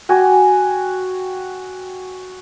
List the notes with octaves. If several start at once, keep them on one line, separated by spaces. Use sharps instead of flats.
F#4 G5 G#5 D6